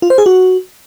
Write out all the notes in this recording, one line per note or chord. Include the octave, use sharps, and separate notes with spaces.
F4
C5
G#4
F#4